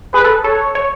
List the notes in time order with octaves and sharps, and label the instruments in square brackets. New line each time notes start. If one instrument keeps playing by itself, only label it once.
[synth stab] G#4 [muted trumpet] B4
[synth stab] A4
[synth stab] A4 [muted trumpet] C#5
[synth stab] C#5